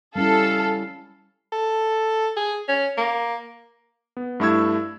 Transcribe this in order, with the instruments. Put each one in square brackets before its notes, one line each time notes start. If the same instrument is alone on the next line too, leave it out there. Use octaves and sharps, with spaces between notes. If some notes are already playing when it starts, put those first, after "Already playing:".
[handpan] G3 C#4 E4 [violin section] A4 [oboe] F5
[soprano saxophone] A4
G#4
C#4
A#3
[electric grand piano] B3
G2 A3 E4 C#6 E6 G#6